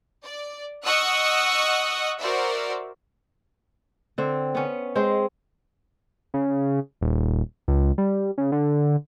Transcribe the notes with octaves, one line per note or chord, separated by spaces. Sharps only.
D5
D#5 F#5 C#6 D#6 E6 F#6
F#4 A#4 C5 D5 E5
D3 C4
B3 C#4
G#3 C4 C5
C#3
D#1
C#2
G3
C#3
D3